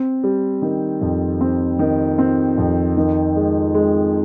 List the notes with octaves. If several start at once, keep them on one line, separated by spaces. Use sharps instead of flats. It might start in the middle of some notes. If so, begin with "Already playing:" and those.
Already playing: C4
G3
D#3
F2
C4
D#3
C4
F2
D#3
G#3
G#3